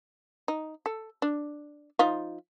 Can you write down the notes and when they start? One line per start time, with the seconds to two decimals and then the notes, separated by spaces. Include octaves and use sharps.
0.48 D#4
0.86 A4
1.22 D4
1.99 F3 D#4 F4